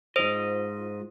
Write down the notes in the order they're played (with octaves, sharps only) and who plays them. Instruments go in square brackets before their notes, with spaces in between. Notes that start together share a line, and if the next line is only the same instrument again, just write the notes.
[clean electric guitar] G#2 D#5 [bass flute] F4 [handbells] C5